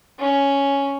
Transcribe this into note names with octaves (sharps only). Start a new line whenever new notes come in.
C#4